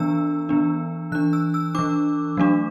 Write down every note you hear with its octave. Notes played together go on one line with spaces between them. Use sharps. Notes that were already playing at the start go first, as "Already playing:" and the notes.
Already playing: E3 B3 D4 E6
E3 B3 D4
E3 D4 F#6
E6
E6
E3 D4 D6
F#3 A3 D4